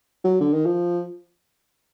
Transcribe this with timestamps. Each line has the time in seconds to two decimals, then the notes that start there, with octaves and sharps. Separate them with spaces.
0.24 F#3
0.40 D3
0.53 D#3
0.65 F3